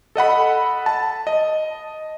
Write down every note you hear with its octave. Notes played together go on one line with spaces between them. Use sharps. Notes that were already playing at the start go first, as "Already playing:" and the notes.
A4 D#5 F#5 B5
A5
D#5